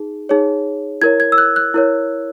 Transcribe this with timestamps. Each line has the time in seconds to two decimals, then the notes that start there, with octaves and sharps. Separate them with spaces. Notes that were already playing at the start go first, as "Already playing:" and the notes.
Already playing: D#4 G#4
0.29 D#4 G#4 C#5
1.02 E4 A#4 C#5 G#6
1.20 G#6
1.32 E6
1.38 F#6
1.56 F#6
1.74 E4 A#4 C#5